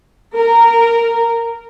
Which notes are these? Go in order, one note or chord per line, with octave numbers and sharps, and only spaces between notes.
A#4